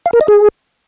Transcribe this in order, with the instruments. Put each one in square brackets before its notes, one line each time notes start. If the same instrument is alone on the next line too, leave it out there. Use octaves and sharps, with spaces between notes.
[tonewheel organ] F5
A#4
D#5
G#4